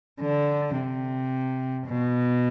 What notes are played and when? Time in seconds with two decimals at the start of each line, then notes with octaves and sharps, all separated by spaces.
0.21 D3
0.77 C3
1.87 B2